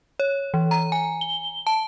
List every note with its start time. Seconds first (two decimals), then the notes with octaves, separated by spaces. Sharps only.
0.20 C#5
0.54 E3
0.71 A#5
0.92 G#5
1.21 G7
1.67 A5